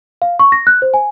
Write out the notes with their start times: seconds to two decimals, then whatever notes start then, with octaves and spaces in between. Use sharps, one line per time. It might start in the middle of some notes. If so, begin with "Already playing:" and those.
0.22 F5
0.39 C#6
0.52 A#6
0.67 F#6
0.82 C5
0.94 G#5